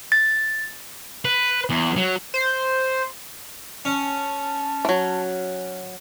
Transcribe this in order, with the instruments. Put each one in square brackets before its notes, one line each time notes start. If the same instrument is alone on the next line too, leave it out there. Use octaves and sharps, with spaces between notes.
[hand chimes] A6
[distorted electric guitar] B4
E2
F#3
[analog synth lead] C5
[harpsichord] C#4 [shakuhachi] A5
[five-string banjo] E3 F#3